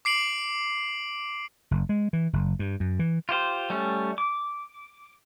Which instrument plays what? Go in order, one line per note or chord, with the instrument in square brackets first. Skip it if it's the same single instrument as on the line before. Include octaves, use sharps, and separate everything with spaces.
[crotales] D6 C7 D7 F#7
[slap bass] F#1
G#3
E3
F#1
G2
F#2
E3
[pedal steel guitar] F4 G4 C5
G3 A3 C#4
D6